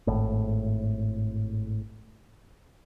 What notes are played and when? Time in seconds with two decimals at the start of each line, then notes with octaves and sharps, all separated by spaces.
0.07 G#1 A2